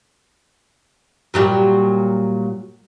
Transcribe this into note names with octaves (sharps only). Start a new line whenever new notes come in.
A#2 F#3 G3